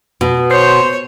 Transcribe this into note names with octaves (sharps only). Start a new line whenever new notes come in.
B2
C5 C#5